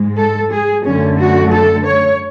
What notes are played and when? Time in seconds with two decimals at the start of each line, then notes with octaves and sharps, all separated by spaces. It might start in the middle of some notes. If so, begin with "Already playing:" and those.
Already playing: G#2 G#3
0.18 A4
0.53 G#4
0.86 F#2 D3 A3 C#4
1.20 F#4
1.53 A4
1.87 C#5